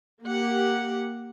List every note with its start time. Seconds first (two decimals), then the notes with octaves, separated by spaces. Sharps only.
0.24 A#3 G4 F#5